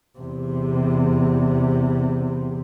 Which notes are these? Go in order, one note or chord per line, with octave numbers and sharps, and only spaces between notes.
E2 C3